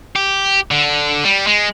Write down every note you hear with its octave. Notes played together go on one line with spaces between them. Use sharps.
G4
D3
G3
G#3